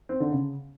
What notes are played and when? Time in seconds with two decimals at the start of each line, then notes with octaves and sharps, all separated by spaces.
0.09 C4
0.20 D3
0.31 C#3